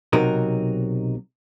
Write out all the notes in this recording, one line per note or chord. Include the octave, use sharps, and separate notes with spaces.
B1 C3 F#3 D#4 A#4